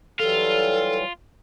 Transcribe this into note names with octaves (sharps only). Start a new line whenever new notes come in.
E3 F#3 G3 F4 A4